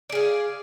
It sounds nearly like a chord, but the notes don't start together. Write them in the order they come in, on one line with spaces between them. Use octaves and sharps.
D5 G#4 F5